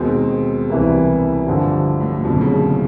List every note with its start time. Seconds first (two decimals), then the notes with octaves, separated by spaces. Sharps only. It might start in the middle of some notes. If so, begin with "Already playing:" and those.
Already playing: D#2 B2 D#3 G#3 C4
0.70 C2 C3 E3 G3 A#3
1.47 G2 D3 F3
2.00 A2
2.12 A#2
2.25 F#1 F2 B2 D3 G3
2.41 C#3